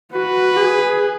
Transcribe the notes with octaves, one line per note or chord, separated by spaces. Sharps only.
F#4 B4
G#4